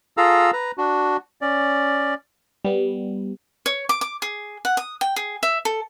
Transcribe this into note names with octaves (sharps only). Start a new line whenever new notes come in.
F4 G#4 A4 F5 A#5 E6
B4 A#5
D4 F#4
C#4 D5
G3 B3
C#5
D6
D6
G#4
F#5
D#6
G5
G#4
E5
A4